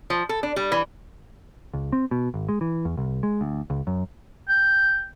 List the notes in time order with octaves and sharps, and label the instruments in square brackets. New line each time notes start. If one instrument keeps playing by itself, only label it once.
[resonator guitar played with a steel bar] F3
A4
D4
G3
E3
[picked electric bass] C#2
C4
B2
G#1
G#3
E3
E2
C2
G#3
D2
C#2
F#2
[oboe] G5